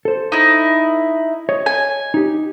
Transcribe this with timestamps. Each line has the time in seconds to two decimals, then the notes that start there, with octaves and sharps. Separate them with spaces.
0.05 A4 C5
0.32 D#4 E4
1.49 C#5 D#5
1.66 G#5
2.14 D#4 G4